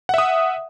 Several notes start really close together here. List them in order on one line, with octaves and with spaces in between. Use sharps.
F#5 E5 D#6